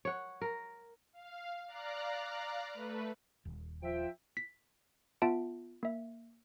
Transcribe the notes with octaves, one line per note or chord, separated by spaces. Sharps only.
C#5 F#5
A#4
F5
D5 F5 A#5 F#6
A3 B4
D#1
F3 E5 G5
B6
B3 F4 E5 A5 D7
A#3 E5